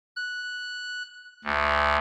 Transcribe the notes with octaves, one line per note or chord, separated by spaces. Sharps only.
F#6
D2